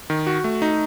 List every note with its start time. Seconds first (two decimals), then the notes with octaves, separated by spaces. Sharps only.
0.10 D#3
0.27 F#4
0.44 A3
0.62 D#4